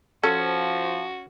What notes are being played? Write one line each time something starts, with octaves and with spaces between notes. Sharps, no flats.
F3 C#4 F#4 A4